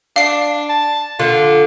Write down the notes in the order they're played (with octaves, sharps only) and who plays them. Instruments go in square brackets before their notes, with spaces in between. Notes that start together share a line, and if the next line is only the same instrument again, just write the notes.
[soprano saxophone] D4 [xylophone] F5 C7
[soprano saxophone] A5
[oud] D3 [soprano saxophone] F4